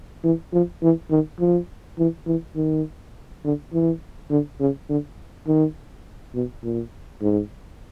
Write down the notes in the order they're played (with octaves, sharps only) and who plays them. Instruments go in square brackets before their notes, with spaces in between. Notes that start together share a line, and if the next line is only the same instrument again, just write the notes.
[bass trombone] E3
F3
E3
D#3
F3
E3
E3
D#3
D3
E3
D3
C#3
D3
D#3
B2
A#2
G#2